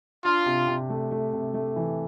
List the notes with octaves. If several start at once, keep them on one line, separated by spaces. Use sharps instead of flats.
D4 F4
C3
C3
A3
A3
C3
A3
E3